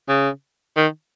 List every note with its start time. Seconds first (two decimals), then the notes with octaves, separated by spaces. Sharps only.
0.09 C#3
0.76 D#3